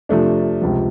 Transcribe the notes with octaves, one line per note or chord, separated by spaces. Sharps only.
C3 F3 A3 D4
C#2 C3 F3